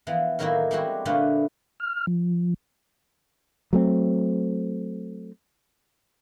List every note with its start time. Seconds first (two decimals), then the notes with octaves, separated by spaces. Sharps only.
0.07 E3 F3 B3
0.39 A2 D#3 F#3 A#3 D#4 E4
0.71 G3 G#3 C4 E4 F#4 G4
1.05 A#2 D3 A3 F4 B4
1.80 F6
2.07 F3
3.73 F#3 A3 C4